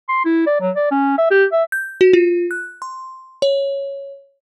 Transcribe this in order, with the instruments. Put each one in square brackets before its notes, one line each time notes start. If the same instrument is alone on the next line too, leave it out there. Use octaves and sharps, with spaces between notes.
[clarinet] C6
E4
D5
F#3
D5
C#4
E5
G4
E5
[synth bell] G6
F#4
F4
F#6
C6
C#5